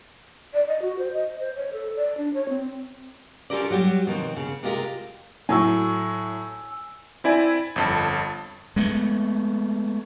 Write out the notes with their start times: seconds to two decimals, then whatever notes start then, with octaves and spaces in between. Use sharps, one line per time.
0.54 D5
0.68 D#5
0.82 F#4
0.99 C5
1.13 D#5
1.40 C5
1.56 C#5
1.73 A4
1.96 D5
2.18 D4
2.34 C#5
2.49 C4
3.50 C#4 F4 G4 A4 A#4 D5
3.70 F#3 G3 F#4 G4
4.07 B2 D#3 F3 C4
4.36 C#3
4.63 C3 G#3 F4 G4 A#4
5.49 A2 F#3 G#5 E6
7.24 C4 E4 D5 G#5
7.76 G1 F2 A5
8.76 G#3 A3 B3